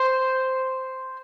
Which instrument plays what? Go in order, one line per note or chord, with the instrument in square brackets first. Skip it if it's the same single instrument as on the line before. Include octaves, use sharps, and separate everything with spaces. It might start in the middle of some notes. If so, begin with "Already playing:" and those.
Already playing: [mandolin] C5